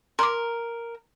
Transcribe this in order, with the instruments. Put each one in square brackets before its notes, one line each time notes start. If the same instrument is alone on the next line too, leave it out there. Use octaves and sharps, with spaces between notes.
[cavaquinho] A#4 [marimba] C6 D6